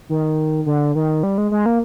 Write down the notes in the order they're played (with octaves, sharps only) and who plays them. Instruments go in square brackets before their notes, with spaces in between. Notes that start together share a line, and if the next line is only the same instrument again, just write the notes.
[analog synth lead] D#3
D3
D#3
G3
G#3
G#3
A#3